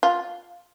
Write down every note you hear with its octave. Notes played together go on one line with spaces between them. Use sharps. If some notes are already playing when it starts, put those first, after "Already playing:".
F4